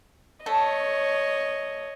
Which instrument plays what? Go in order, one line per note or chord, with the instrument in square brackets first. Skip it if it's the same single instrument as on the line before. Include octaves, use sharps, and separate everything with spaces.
[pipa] A3 A4 [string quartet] C#5 D#5